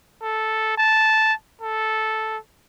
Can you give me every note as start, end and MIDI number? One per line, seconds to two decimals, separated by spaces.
0.22 0.73 69
0.78 1.34 81
1.62 2.38 69